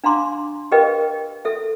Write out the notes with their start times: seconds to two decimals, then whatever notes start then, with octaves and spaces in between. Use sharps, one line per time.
0.04 D4 F5 A#5 C6 D6
0.72 G4 A#4 B4 D#5 F5 G5
1.45 A4 E5